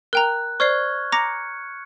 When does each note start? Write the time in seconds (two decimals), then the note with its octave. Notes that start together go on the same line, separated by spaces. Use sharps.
0.13 A#4 G5 A#5 F#6
0.60 C5 D5 C#6 F6 G#6 C7
1.12 A#5 D6 A#6 C#7